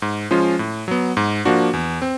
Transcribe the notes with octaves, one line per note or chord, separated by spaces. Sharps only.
G#2
F3 G#3 C#4 F4
A2
F#3 B3
G#2
F3 A#3 D4 F#4
E2
C4